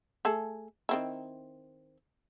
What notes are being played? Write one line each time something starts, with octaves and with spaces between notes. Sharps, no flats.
A3 G#4 A4
D#3 C4 E4